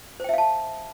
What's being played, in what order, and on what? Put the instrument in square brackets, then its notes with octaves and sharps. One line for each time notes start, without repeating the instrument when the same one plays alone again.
[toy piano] C5
G5
E5
F5
A5